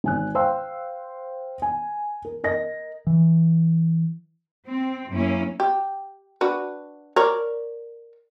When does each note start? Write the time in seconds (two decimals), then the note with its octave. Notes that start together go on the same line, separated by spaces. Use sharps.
0.04 G#1 G#5 F#6
0.35 C5 F5 G5 C6 E6
1.62 G#5
2.25 A#4
2.44 A#4 D#5 A#6
3.07 E3
4.68 C4
5.11 F#2 A#3 C#4 E4
5.60 G4
6.41 D4 F#4 B4
7.16 A#4 C#5 D5